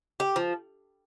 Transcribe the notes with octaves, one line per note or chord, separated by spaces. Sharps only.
G4
F3